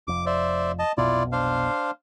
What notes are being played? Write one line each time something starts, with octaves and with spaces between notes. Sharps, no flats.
F1 F2 D6
C5 D5 E5
D#5 A5
F1 B1 B2 E4 F4 D5
D4 C5 F5